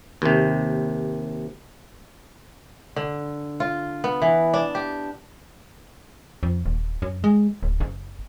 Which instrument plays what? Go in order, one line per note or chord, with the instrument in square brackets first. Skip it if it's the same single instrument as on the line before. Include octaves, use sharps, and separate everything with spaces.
[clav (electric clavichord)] D#2 C3
[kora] D3
F4
B3
E3
D4
G4
[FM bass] F2
D#1
F#2
G#3
D1
F#1